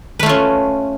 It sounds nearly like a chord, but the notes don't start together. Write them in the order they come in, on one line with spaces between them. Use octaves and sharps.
B4 A3 F4 C#4